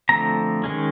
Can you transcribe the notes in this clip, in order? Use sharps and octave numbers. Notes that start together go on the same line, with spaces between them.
D3 F3 A3 C4 A#5
D#3 G#3 C#4